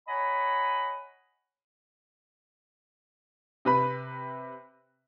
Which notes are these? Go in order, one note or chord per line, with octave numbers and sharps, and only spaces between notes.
C#5 D#5 F#5 G#5 A#5 B5
C3 B4 B5